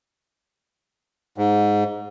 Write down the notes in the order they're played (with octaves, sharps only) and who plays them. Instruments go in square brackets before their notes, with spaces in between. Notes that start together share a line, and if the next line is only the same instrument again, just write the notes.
[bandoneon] G#2